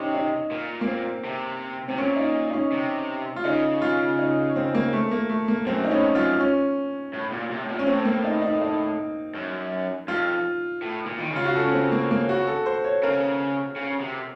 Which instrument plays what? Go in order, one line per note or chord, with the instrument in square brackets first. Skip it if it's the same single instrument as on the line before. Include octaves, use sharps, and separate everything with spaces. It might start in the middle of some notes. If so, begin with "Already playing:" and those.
Already playing: [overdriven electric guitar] C3 [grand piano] C#4 D#4
[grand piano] D#4
[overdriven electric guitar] A#2
[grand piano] A#3
C4
[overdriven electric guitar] C3
[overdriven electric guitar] C3 [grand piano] C4
[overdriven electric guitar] A#2 [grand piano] C#4
[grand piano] D#4
D#4
C#4
[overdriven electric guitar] C3
[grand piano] F4
[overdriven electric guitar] C#3 [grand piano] D#4
[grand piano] F4
D#4
C4
A#3
A3
A#3
A3
A#3
[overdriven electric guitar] F#2 [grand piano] C4
[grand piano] D#4
[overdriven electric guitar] A2 [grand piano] C#4
[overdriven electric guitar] F#2 [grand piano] F4
[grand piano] C#4
[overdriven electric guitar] A2
A#2
C3
A2
A#2
[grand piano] C#4
[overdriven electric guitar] A2 [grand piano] C4
[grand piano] A#3
D#4
D#4
D#4
[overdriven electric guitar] F#2
[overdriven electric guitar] F2 [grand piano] F4
[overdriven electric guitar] A2
A#2
D#3
C#3
[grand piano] F4
F#4
A4
C#4
C4
A#3
A#3
F#4
A4
C5
C#5
[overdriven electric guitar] C#3 [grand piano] A#4
[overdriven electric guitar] C#3
C3